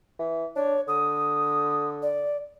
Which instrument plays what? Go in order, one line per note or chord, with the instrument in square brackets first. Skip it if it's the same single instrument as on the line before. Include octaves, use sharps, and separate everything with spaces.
[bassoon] E3
[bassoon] D4 [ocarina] C#5
[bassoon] D3 [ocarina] D#6
[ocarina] D5